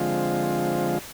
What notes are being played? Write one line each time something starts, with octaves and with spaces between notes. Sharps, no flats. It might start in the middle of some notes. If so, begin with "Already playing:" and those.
Already playing: D3 F3 G#3 C4 F4